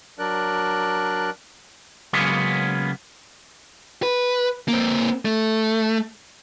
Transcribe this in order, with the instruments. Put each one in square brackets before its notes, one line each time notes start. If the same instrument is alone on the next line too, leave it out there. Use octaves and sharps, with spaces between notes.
[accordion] F#3 D4 A#4 D5 F#6
[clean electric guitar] C#3 F#3 G#3 A#3 B3 C#4
[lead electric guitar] B4
A#3 C4
A3